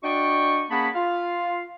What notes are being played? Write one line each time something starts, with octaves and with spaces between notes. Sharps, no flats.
D4 F#4 D5 D#5 G5 C#6
A#3 C#4 G#4 F#5 A5 B5
F4 F5